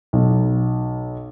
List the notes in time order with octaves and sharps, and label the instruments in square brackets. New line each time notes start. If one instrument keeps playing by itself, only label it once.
[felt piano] B1